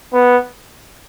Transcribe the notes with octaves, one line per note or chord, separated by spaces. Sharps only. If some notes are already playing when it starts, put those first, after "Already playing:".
B3